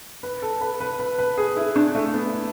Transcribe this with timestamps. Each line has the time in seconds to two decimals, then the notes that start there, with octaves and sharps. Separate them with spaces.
0.23 B4
0.42 A4
0.61 B4
0.80 B4
0.99 B4
1.19 B4
1.38 G#4
1.57 E4
1.76 D4
1.95 A3
2.14 B3
2.33 E4